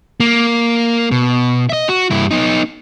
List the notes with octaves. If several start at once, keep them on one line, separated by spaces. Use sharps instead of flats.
A#3
B2
D#5 E5
F#4
G2 E4
B3 D#4